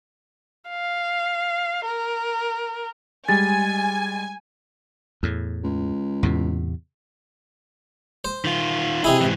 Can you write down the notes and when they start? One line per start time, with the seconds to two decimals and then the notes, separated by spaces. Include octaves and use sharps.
0.70 F5
1.85 A#4
3.28 G3 G#3 G#5 A6
5.23 E2 A2
5.64 C#2
6.23 E2 A2 C3
8.25 C5
8.45 D#3 F4
9.04 C3 D#4 E4 G#4
9.21 G#2 E3